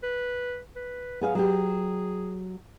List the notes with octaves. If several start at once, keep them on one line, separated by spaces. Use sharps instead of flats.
B4
B4
F#3 B3 G#4 F5
F#3 G4 G#4